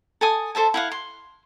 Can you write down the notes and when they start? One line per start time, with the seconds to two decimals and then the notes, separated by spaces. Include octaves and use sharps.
0.21 A4 G#5 D#6
0.55 A4 C5 E5 A5
0.74 E4 F5 F#5
0.92 C6